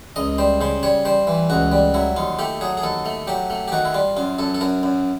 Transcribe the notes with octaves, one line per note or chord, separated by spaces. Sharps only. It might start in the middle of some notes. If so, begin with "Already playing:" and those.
C#2 D#5
G3 C5
C#3 C5
G3 C#5
G3 C5
E3
C#2 F#4
G3
F#3 E4
D#2 F4
A3 G4
F#3 G#4
G#4
D#2 A4
A3
F#3 G4
A3
G4
D#3 F#4
E4
G3 F4
F#2 F4
F#2 A4
A4
F#2 A#4
F#2